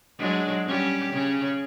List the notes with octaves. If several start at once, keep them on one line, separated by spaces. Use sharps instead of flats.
F#3 G#3 D4
G3 C#4 G4
C#3 C#4